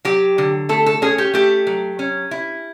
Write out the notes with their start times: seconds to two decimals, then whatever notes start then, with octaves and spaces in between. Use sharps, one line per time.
0.05 F#3 G4
0.38 D3
0.69 A3 A4
0.86 A4
1.02 C#4 G#4
1.18 G4
1.34 A3 G4
1.67 F#3
1.99 C#4
2.31 E4